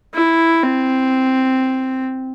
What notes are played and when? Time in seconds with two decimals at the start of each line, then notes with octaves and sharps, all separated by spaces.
0.15 E4
0.63 C4